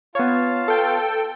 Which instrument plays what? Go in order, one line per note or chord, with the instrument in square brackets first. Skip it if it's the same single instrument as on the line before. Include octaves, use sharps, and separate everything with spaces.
[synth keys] B3 C#5 [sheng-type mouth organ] F4 F5 A5
[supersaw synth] A4 G5